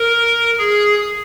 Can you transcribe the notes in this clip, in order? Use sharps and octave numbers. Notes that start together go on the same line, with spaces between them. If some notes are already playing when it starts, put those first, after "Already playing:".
Already playing: A#4
G#4